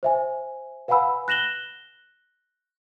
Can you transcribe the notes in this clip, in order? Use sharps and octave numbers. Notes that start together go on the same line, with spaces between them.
C5 E5 G#5
B4 F5 F#5 G#5 B5 E6
F#6 A#6 E7 F#7 G7